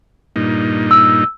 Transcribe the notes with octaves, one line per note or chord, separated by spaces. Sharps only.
G2 A#2 D#4
E6